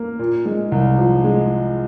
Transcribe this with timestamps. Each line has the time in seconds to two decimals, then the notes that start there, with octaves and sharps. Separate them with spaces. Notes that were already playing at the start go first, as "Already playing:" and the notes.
Already playing: A#3
0.19 A#2
0.46 G#3
0.72 C2
0.98 F3
1.24 G#3